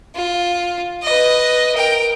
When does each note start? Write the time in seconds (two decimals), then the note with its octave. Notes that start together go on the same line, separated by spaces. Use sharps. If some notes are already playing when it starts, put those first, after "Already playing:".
0.15 F4
1.03 B4 D#5
1.75 A#4 G5